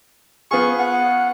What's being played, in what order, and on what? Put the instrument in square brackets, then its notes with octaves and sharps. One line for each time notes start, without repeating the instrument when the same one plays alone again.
[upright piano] B3 F4 G#4 [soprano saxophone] C#6
[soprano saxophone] F#5